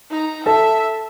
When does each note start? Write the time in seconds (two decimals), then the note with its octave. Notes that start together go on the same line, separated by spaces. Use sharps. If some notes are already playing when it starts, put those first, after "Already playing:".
0.10 D#4 A#5
0.46 A4 E5 A5